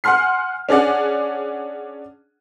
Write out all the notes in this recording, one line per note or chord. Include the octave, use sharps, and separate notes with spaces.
F#5 G#5 C6 F6 C7
C#4 D4 G#4 D5 F#5